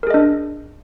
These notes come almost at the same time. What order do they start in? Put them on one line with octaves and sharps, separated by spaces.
A#4 G#4 D#5 D4